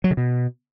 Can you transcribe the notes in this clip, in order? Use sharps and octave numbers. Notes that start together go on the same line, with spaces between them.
F#3
C#3
B2